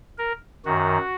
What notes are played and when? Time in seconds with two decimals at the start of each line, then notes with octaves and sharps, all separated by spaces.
0.18 A#4
0.65 F#2 D#3 F#4